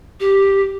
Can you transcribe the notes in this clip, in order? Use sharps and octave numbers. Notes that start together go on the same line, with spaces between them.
G4